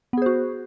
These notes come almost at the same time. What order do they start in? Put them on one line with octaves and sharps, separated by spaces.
B3 G#4 C5 F#4